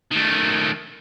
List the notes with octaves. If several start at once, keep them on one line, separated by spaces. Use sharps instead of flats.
D#3 A3